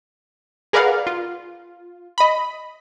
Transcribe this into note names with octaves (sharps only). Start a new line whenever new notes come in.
G#4 A#4 B4 D5 F5 F#5
F4
D#5 B5